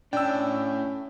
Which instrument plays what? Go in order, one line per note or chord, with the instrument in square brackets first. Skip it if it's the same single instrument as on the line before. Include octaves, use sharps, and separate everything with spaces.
[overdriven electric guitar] A2 [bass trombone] C#4 [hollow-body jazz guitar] D4 [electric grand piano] G5 E6